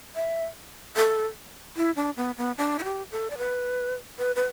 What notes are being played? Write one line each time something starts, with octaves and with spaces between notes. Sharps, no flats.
E5
A4
E4
D4
B3
B3
D4
E4
G4
A4
D5
B4
B4
B4